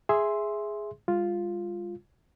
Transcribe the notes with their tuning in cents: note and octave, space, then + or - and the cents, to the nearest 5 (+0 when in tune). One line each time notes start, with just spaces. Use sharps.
G#4 +0 E5 +0 C6 +0
G#3 -45 F4 +0